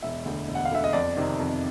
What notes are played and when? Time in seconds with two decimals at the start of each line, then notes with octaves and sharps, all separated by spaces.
0.02 E1 E5
0.25 D2 D3
0.48 E1
0.55 F#5
0.65 F5
0.71 D2 D3 E5
0.84 D#5
0.93 F2 D5
1.17 C3 D#3
1.39 F2